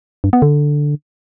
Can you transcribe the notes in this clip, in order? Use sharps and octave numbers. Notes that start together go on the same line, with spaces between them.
G2
B3
D3